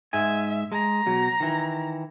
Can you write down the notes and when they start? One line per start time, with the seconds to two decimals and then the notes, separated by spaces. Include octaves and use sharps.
0.13 G#2 G#3 E5 G#5
0.72 G#3 A#5
1.06 B2 F#3
1.40 D#3 E3